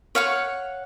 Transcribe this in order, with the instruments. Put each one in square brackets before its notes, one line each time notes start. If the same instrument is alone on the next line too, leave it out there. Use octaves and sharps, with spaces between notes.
[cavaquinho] C#5 F5 F#5 C#6